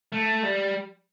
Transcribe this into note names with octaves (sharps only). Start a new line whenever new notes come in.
A3
G3